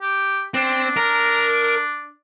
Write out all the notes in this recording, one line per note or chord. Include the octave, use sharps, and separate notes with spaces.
G4
C4 D4
A#4